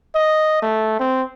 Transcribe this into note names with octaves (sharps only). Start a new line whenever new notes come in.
D#5
A3
C4